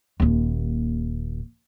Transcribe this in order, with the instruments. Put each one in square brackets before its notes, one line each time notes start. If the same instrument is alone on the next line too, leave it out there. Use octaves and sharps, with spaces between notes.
[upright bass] D#1 D#2